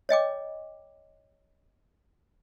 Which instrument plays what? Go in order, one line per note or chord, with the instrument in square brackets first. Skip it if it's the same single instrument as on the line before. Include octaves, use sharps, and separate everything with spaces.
[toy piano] C#5 D#5 G5 D6